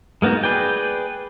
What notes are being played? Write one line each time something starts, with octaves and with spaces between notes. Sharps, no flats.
G#3 A#3 B3 D#4 F#4
G#4 B4 D5 G5